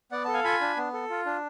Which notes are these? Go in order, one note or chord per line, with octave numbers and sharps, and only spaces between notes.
B3 D5 F#5
A4 A5
F5 G#5
F4 G#5 B5
D4
B3
A4
F4
D4